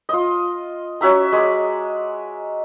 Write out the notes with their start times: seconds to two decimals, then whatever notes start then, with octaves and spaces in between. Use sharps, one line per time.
0.09 F4 D#5
1.01 C#4 F#4 E5 A#5
1.32 G#3 D5